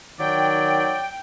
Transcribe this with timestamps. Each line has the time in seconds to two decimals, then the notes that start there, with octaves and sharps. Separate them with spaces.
0.20 D#3 F#3 D5 G5